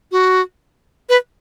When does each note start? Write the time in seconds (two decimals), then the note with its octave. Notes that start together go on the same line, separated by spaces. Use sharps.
0.12 F#4
1.09 B4